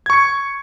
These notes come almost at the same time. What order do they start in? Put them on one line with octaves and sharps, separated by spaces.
G#6 C#6 C#7